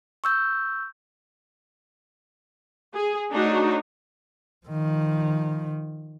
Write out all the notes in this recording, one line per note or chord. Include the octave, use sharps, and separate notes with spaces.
C#6 E6 G6
G#4
A3 D4 D#4 F#4 C#5
D#3 F3